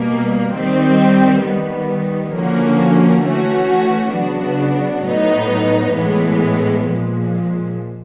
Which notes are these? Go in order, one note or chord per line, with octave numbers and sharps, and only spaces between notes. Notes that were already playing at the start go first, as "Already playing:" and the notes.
Already playing: B2 G3 A#3
D#3 G3 C4
D#3 G3 B3
D3 F3 A#3 C#4 F#4
E3 A3 C#4 F#4
C#3 F#3 B3 D4 F#4
A2 F#3 B3 D#4
A2 E3 G#3 B3
A#2 F3 G#3